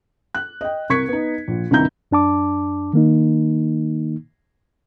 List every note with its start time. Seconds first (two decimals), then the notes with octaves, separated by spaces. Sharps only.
0.35 F#6
0.61 D#5 G5
0.90 C2 A#4 C#6 G#6 B6 C#7
1.08 B3 D#4
1.48 A#1
1.71 C2 G2 D#3 E4 A#5 G6
2.11 F#2 D4 A5 D6
2.93 D#3 A#3 D#4